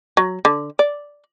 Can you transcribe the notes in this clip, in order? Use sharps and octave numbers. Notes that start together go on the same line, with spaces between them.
F#3
D3
D5